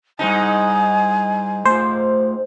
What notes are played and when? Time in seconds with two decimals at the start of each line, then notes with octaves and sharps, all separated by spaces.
0.19 G#2 G3 D#4 E4 G#5 A5
1.65 A3 F4 C5